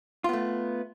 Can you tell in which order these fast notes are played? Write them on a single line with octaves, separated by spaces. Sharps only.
F4 B3 A3